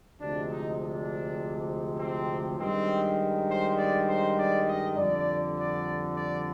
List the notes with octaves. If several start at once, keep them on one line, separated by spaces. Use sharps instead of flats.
D2 C3 F3 G#3 D4
D#4
D4
C4
G2 D#3 G#3 C4
C5
D5
C5
D5
D#5
F2 D3 G3 D5
D5
D5